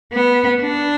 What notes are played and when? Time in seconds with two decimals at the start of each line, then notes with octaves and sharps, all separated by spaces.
0.13 B3
0.61 D4